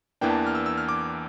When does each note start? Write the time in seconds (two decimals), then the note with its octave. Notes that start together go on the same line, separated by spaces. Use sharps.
0.21 E2 E3 A#3 D4 G5
0.30 A5
0.47 F6
0.55 E6
0.66 E6
0.78 F6
0.89 D6